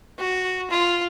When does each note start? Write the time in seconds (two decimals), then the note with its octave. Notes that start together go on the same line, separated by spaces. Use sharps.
0.19 F#4
0.71 F4